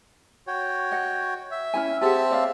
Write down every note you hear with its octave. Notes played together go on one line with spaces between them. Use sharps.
F#4 C#5 G5
D#5 F#5
E5
C#4 E4 G#5
C4 G4 G#4 E5 F#5 A5
C#5 D5 F5